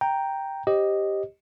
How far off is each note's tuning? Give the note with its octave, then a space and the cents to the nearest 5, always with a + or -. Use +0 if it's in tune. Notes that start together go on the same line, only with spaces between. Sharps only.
G5 +0 A#5 +0
G4 +0 C5 +25 D#5 +0